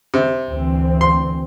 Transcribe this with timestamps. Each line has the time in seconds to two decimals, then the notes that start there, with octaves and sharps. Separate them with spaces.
0.14 C3
0.46 D2 E3 C4
1.01 C6